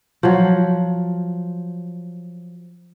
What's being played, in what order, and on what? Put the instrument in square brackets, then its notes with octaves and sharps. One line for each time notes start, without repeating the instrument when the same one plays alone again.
[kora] F3 F#3